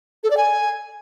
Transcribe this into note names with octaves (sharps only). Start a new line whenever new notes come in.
A4
D5
G#5